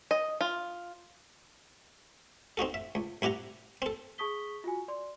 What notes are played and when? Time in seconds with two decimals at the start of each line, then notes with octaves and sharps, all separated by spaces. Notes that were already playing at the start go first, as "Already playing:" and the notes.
0.11 D#5
0.41 F4
2.57 C4 D#4 F#4 A4
2.74 E5
2.95 C#2
3.22 C2 E4 G4 F#5 A#5
3.82 C4 A4
4.18 G#4 A5 C#6 D#6 B6 G7
4.64 F4 F#4 G#5
4.88 D5 C6